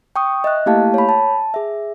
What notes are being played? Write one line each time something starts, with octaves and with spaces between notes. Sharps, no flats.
G5 C#6 D#6
D#5 E5 F#6
A3 A#3 E4 G4 F5 A5
C#5 B5
A5
G#4 E5